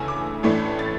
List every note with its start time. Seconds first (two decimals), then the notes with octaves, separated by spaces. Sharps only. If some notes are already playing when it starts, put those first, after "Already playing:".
Already playing: D2 C#3 E3 A3 G#5 E6
0.08 D6
0.43 A1 A2 E3 A3 D4
0.79 A6